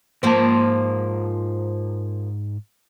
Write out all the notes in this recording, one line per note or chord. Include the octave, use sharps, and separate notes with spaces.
G#2 F3 A#3 C5 A5